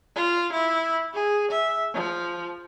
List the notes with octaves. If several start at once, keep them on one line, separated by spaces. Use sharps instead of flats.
F4
E4
G#4
E5
F3